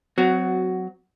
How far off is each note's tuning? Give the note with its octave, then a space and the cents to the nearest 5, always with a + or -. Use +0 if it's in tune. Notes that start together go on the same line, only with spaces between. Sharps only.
F#3 +0 C4 -30 F#4 +10